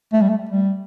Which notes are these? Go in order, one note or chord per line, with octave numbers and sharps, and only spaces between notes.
A3
G3
A3
G3